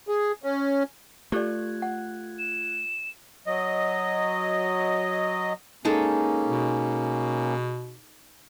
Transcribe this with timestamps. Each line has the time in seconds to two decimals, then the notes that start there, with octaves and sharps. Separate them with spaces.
0.08 G#4
0.43 C#4
1.32 A3 F4 G4 A4 D5 F#6 G#6
1.82 F#5
2.39 E7
3.47 F#3 D#5
5.85 G#3 A#3 C#4 D#4 A4
6.48 B2